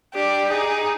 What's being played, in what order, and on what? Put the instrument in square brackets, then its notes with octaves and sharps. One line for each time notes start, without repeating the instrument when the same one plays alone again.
[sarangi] D4 [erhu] G4
[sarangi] D#4 [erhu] G#4